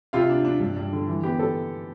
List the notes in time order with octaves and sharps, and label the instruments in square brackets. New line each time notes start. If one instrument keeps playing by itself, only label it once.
[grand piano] C3 F4 F5
D4
D4
G2
G2
D3
E3
B3 G4
A4